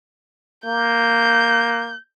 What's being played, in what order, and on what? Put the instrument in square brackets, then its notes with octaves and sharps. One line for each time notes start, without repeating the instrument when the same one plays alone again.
[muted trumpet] A#3 [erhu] G6